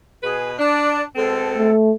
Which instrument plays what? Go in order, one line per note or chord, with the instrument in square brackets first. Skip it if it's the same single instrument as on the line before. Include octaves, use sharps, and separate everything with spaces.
[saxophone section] B2 B4 [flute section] G#4
[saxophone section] D4 [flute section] D5
[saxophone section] B2 G#3 C4 [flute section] A4
[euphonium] A3